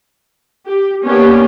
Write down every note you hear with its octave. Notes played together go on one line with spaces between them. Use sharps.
G4
A#3 B3 C#4 D4 G4 C#5